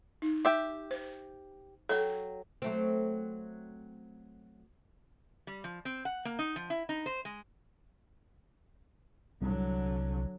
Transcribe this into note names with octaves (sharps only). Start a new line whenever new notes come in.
D#4
G4 E5 G5
C5
F#3 A4 G5
F#3 A3 C4
G3
F3
C4
F#5
A#3
D#4
F3
E4
D#4
C5
G#3
C2 D3 F#3